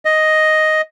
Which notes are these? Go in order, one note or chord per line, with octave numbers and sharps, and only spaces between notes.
D#5